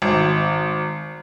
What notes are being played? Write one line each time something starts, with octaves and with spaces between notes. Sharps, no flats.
G#1